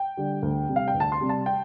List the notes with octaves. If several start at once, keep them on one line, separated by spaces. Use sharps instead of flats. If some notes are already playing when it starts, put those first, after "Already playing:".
Already playing: G5
D3 G3
D2
C3 G3
F5
G5
D2
A5
C6
C3 G3
A5
G5